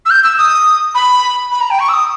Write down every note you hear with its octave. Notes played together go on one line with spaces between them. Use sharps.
E6
G6
E6
D#6
B5
B5
A#5
G5
C#6
E6
D#6